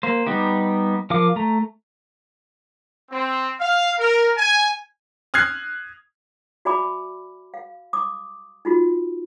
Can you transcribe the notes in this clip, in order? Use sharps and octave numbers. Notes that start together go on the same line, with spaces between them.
A#3 C5
G3 B3 D#4 G4
F3 A#4 F5 D6
A3 A#5
C4
F5
A#4
G#5
D#6 F6 F#6 G#6 C7
F#4 D5 E5 G#5 B5 D6
F5
D6 D#6
D#4 F4 F#4